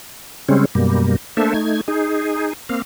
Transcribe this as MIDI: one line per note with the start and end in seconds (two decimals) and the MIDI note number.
0.49 0.65 49
0.49 0.65 55
0.49 0.65 56
0.49 0.65 60
0.49 0.65 61
0.75 1.16 42
0.75 1.16 47
0.75 1.16 55
0.75 1.16 58
1.37 1.54 57
1.37 1.54 58
1.37 1.54 62
1.37 1.54 69
1.37 1.54 72
1.37 1.54 76
1.54 1.81 57
1.54 1.81 63
1.54 1.81 92
1.88 2.53 63
1.88 2.53 68
2.69 2.82 58
2.69 2.82 60
2.69 2.82 77